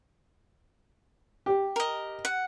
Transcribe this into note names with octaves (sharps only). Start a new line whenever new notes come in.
G4
A#4 D#5
F#5